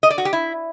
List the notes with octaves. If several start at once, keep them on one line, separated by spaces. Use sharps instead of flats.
D#5
D5
F#4
G4
E4